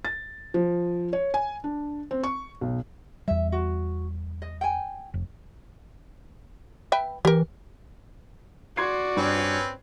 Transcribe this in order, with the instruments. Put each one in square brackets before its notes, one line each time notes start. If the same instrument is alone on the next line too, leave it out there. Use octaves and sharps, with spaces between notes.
[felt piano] A6
F3
C#5
G#5
D4
C4
C#6
B1
[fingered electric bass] E2 G3 [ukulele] E5
[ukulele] F#4
D#5
G5 G#5
[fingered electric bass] F1
[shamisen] B4 E5 G5
[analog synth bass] E3 [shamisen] G4 A#4
[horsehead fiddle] F#4 D5 [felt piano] C6 G#6 C7
[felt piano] G2 [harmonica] C4 C#4 B4